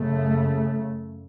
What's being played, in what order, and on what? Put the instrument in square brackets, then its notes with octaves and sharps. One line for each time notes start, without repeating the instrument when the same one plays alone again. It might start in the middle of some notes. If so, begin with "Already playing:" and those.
Already playing: [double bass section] F#2 C#3 A3